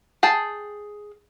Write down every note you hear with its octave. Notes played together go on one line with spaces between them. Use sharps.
G#4 G5 A5